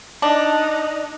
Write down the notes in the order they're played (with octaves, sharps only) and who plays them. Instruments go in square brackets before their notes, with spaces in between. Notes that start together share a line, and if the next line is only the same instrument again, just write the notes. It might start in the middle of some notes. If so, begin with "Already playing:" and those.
[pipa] D4 [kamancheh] D#4